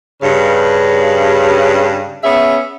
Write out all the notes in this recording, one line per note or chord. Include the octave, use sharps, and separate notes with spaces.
G2 C#3
B3 C#4 G#4 E5